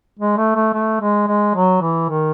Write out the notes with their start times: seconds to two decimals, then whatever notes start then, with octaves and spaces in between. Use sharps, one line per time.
0.19 G#3
0.37 A3
0.55 A3
0.73 A3
1.01 G#3
1.28 G#3
1.55 F#3
1.81 E3
2.09 D#3